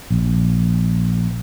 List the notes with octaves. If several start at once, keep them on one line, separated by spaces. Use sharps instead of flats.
A#1